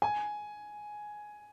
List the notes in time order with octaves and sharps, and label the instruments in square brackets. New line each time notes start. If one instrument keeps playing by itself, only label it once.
[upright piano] G#5